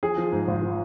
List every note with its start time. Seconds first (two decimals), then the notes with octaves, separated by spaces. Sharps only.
0.03 F3 G#4
0.18 F3
0.32 G#2
0.48 G#1
0.62 F3